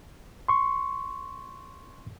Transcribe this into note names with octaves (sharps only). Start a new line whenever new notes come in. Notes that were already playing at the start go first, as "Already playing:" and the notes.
C6 C#6